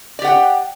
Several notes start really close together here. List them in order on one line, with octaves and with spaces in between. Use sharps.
D5 G4 F#5 G5